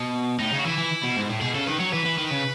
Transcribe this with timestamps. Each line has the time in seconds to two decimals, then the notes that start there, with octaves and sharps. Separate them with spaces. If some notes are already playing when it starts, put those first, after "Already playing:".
Already playing: B2
0.39 A2 D#4
0.52 C#3
0.59 F#4
0.65 E3 E4
0.78 E3
1.03 B2
1.16 G#2
1.29 A2
1.41 B2 G#4
1.55 C#3 A4
1.67 D#3 B4
1.80 F#3 C#5
1.93 E3 B4
2.05 E3
2.18 D#3
2.31 C#3